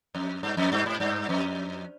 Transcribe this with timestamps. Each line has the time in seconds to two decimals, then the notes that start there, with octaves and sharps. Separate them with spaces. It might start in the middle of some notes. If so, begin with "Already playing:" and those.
0.15 F2
0.43 G2
0.57 F2
0.72 G2
0.86 G#2
1.00 G2
1.29 F2